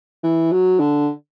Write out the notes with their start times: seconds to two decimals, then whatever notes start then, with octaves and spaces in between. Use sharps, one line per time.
0.24 E3
0.52 F#3
0.80 D3